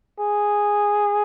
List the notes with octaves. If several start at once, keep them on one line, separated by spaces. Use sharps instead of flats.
G#4